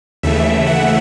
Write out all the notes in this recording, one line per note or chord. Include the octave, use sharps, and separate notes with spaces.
D#2 C#3 E3 A3 E5
F#5